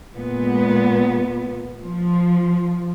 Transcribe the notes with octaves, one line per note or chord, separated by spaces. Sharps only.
A#2 G#3 B3
F3